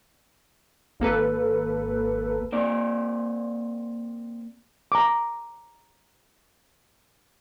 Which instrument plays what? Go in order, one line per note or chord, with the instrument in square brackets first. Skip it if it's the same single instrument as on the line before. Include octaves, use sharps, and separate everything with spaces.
[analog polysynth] G#1 A#3 A4 B4
[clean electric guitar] A#3 C4 D5
[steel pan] A#5 D6